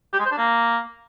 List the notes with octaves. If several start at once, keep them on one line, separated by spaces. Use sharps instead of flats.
G4
G#3
C5
D4
A#3